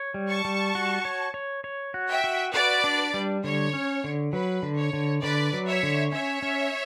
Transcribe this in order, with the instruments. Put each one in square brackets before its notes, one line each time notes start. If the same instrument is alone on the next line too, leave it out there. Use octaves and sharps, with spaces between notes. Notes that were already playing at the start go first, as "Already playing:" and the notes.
Already playing: [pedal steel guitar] C#5
G3
[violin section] A5 C#6
[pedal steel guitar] G3
F#4
C#5
C#5
C#5
F#4
[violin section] E5 G5
[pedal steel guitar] F#4
[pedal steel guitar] F#4 [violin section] B4 D5
[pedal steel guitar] D4
G3
[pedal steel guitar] D3 [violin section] C#5
[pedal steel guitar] C#4
D3
[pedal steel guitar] F#3 [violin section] B4
[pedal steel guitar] D3
[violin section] C#5
[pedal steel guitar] D3
[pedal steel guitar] D3 [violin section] B4 D5
[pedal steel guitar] F#3
[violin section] C#5 E5
[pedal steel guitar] D3
[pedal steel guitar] C#4 [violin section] C#5 E5
[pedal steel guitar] C#4